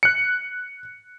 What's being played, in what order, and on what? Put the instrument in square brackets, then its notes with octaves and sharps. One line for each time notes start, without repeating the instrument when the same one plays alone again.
[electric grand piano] F#6 C#7